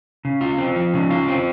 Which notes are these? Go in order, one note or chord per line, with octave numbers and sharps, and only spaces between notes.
C#3
F4
C4
F3
C#3
F4
C4